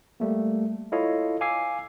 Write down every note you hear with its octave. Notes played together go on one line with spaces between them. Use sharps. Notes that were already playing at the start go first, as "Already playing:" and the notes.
G3 A3 A#3
E4 F4 A4 C#5 D#5 F5
F5 G#5 D6 E6 C7